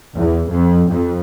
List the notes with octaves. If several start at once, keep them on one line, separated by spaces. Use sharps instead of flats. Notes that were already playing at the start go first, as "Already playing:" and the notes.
E2
F2
F2